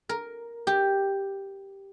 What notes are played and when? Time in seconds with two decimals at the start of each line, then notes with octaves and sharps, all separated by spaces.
0.09 A#4
0.67 G4